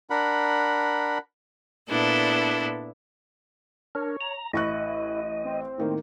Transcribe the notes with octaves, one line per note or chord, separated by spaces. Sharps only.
D4 A#4 F#5 B5
A#2 B3 D4 E4 A4
D4 A#4 C#5
A#5
A1 E4 D#5 C#6 F#6
C4
A2 D#3 A#3